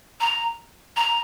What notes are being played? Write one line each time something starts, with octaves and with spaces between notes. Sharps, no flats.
A#5
A#5